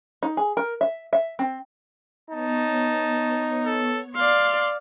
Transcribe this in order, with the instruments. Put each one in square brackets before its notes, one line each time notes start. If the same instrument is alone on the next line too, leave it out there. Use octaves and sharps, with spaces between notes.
[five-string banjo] D#4
G#4
A#4
E5
E5
C4
[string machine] B3 C#5 [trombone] D#4 [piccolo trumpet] A5
[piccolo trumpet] A4
[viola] D5 F5 [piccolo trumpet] C6